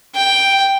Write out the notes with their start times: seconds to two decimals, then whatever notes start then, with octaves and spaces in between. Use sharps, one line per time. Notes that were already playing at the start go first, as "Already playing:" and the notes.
0.15 G5